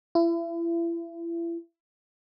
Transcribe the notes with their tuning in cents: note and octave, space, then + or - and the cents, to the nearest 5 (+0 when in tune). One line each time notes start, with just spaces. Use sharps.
E4 +30